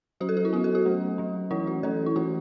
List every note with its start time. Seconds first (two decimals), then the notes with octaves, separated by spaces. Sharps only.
0.20 F#3 C#4 F#4
0.29 A4
0.37 F#4
0.45 E4
0.53 B3 F#4
0.56 F#3
0.64 A4
0.75 F#4
0.85 F#3 A3 C#4
1.18 F#3 C#4
1.51 E3 A3 C#4 E4
1.67 F#4
1.83 E3 A3 C#4 A4
2.06 E4
2.16 E3 A3 C#4 F#4